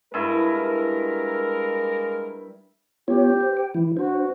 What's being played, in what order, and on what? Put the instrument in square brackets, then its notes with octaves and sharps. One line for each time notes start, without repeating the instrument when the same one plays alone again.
[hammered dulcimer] G2 E4 [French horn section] G#3 A#3 A#4
[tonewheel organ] B3 F4 C#5 [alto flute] G4
[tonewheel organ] C5
G5
E3 E4
[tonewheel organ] D4 C5 [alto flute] F#4